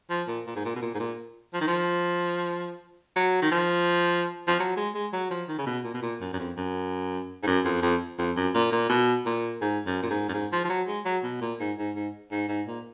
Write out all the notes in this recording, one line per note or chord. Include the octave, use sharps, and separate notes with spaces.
F3
A#2
A#2
G#2
A#2
B2
A#2
G#2
A#2
F3
D#3
F3
F#3
D#3
F3
F3
F#3
G#3
G#3
F#3
F3
D#3
C#3
B2
A#2
B2
A#2
F#2
F#2
F2
F#2
G#2
F#2
F2
F2
F2
F#2
A#2
A#2
B2
A#2
G#2
F#2
A#2
G#2
F#2
G#2
F3
F3
F#3
G#3
F#3
B2
A#2
G#2
G#2
G#2
G#2
G#2
A#2